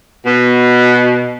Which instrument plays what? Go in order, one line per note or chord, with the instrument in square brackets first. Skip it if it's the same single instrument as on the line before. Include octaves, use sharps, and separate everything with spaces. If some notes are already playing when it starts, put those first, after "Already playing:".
[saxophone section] B2